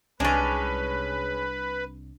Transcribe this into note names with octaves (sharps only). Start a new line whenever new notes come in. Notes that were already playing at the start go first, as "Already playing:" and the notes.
C2 G#3 C#4 D4 B4 D5